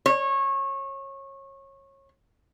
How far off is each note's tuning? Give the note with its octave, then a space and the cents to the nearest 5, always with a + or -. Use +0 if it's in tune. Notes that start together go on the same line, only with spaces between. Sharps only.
C#5 -25